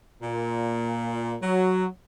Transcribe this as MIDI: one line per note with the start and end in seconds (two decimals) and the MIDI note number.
0.22 1.35 46
1.42 1.85 54